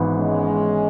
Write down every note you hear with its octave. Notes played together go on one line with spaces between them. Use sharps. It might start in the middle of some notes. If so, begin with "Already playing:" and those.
Already playing: G#1 G#2 E3 B3
G#3 C#4